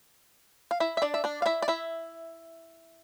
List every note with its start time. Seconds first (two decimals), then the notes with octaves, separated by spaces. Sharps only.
0.71 F5
0.80 E4 E5
0.97 E5
1.02 D4 D5
1.14 E5
1.24 D4 D5
1.42 F5
1.46 E4 E5
1.62 D5
1.68 E4 E5